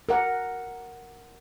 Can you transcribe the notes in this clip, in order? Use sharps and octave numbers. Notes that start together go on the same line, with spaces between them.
A#4 F#5